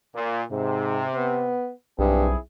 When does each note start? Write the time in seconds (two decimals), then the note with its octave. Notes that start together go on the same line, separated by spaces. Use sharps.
0.15 A#2
0.51 G#2 C3
1.15 B3
1.99 B1 G2 C4 E4 G#4